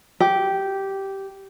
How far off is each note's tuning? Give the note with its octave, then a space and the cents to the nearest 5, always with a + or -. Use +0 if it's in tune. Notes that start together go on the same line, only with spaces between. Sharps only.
G4 -10